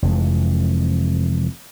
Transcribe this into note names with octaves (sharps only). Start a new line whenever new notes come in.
F1 F2 E3 G#3